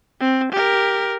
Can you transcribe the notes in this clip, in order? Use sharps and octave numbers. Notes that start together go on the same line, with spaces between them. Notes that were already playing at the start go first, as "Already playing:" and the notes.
C4
G4 A#4